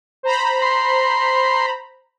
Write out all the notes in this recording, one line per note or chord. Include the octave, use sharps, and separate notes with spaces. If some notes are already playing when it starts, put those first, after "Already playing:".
C5 A#5 B5
C6